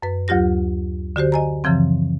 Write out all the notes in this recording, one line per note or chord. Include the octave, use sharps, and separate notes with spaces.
F#2 B4
D2 F#3 F4 G4 A#6
D3 F#4 G4 C5
D#5 G#5 A#5
F#2 C#3 E3 F3 C4